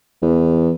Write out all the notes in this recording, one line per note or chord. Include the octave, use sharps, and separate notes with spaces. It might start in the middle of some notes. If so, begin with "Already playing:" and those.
E2